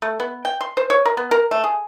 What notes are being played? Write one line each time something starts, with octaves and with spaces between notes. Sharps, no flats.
A3
B3
G5
C6
C5
C#5
A#4
B3
A#4
A3
G#4